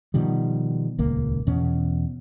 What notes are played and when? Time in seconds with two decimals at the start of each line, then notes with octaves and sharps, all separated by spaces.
0.14 B2 D#3 F3 G3
0.98 D#1 C#2 A#3
1.47 E2 B2 C#4